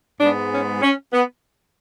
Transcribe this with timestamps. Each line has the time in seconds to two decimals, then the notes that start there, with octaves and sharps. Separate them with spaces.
0.21 G#2 G#3 B3 D4
0.52 C#4
0.82 C#4
1.13 B3